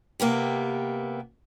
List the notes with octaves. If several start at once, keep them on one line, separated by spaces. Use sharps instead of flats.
C3 A#3 B3 G4